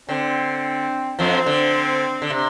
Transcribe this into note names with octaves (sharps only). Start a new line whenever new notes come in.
D3 C4
F2 F3 C4
D3
D3
C3